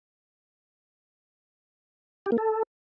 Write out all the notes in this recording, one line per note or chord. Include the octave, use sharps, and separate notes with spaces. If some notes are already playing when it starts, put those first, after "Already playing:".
G4
A#3
A4